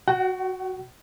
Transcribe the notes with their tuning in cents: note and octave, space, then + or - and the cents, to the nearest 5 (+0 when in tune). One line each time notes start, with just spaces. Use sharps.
F#4 +0 F#5 +45